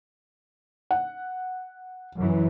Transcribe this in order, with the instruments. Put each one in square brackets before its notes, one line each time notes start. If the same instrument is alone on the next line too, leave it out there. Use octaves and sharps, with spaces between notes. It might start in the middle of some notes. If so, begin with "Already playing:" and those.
[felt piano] F#5
[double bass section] F#2 E3